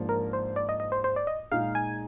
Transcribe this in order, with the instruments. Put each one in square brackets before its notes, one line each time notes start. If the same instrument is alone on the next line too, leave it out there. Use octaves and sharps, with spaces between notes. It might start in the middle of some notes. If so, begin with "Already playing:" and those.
Already playing: [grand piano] G#2 F3 A#3 D4
[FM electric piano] A#4
C5
D5
D#5
D#5
C5
C5
D5
D#5
[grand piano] A#2 G#3 D#4 G#4 [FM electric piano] F5
[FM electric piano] G#5